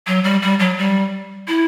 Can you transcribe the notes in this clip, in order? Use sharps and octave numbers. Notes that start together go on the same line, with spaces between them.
F#3
G3
G3
F#3
G3
E4